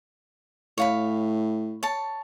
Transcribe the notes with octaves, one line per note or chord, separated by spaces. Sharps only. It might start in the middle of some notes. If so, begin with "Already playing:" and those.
A2 C#5 F5 B5
C#5 A5